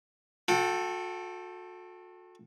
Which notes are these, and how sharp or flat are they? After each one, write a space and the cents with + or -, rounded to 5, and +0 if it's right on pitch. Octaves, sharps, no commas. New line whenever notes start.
F#4 -40 A4 +0 G5 +0